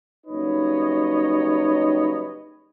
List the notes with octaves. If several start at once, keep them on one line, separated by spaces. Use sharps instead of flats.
F#1 G3 D#4 B4 C#5 D#5